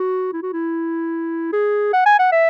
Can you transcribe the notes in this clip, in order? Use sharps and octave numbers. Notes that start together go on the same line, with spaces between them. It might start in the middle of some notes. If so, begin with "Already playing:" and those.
Already playing: F#4
E4
F#4
E4
G#4
F#5
G#5
F#5
E5